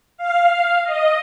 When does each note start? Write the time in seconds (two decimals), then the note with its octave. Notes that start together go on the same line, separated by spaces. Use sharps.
0.17 F5
0.84 D#5